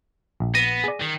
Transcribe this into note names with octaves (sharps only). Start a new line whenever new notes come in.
A#1
B3 A#6 D#7
G#4 D5
D#3